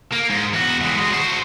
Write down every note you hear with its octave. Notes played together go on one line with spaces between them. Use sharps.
A#3
G#2
E2 F#4
E3 G#3
G#3 F#4
F#4 C5